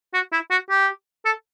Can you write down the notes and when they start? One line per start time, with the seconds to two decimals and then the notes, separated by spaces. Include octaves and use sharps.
0.14 F#4
0.32 E4
0.51 F#4
0.70 G4
1.25 A4